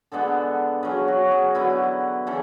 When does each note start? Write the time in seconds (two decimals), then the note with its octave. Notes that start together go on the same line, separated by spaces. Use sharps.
0.12 D3 G#3 B3 D4 A4
0.83 C#3 F#3 C#4 G#4
1.08 F#4
1.31 G#4
1.55 D3 F#3 B3 E4
2.27 C#3 E3 A4